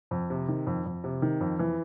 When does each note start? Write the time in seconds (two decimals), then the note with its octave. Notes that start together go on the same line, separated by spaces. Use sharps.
0.11 F2
0.30 C3
0.48 D#3
0.67 F2
0.86 F2
1.04 C3
1.22 D#3
1.41 F2
1.59 E3